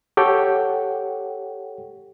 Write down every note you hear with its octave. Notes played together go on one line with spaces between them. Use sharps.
G4 A4 C#5 F#5 G5